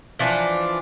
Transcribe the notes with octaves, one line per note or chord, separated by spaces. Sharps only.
E3 F3 D4